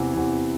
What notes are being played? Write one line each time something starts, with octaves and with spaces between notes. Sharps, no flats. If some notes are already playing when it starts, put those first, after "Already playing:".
Already playing: E2 C3 E3
E2 C3 E3